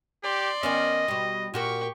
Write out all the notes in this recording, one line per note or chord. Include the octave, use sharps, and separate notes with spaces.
G4 D5 C6
D#3 B3 C#4 D#5
B2 G3
A#2 F#4 G4 A#4 C#6